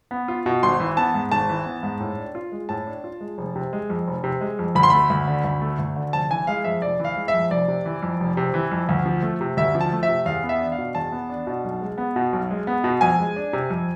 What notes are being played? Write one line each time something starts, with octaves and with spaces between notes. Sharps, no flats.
B3
F4
B2
G#1 C6
E3
B3 A5
G#2
G#1 A5
E3
B3
G#2
A2
D4
F4
G#3
A2 A5
D4
F4
G#3
F1
C3
G#3
F2
F1
C3
G#3
F2
D2 B5
C6
A3 B5
D2
D3
D2
A3
D2
D3
F1 A5
E3 G#5
G#3 F5
F2 E5
F1 D5
E3
F5
G#3
E5
F2
F1 D5
C3
E3
F2
F1
C3
E3
F2
D2
F3
A3
C3
D2 E5
F3
A5
A3
E5
C3
E2 F5
B3
E5
D4
F5
B2
E2 A5
B3
D4
B2
B1
G#3
B3
B2
B1
G#3
B3
B2
F2 G#5
G#3
D4
C3
F2